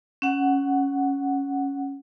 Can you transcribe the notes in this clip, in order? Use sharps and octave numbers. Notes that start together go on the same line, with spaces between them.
C#4 F#5